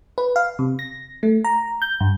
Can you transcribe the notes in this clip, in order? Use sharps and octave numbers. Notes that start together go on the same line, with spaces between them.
B4
F5
C3
A#6
A3
A#5
G6
G2